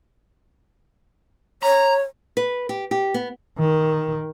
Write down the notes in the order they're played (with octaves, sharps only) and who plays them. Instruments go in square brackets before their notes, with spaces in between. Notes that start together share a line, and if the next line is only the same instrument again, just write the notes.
[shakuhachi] C#5 [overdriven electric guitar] A#5
[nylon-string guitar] B4
G4
G4
B3
[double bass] D#3